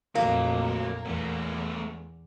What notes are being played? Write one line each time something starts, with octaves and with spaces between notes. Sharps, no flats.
A#1 F2 F#3 A3 A#3
E2 A3 B3